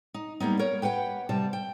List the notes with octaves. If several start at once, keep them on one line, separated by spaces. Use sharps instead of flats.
D#4
G3 A#3 B3 D#4
A#4 C#5
G4 B4 F#5 G5
C3 G3 A5
G5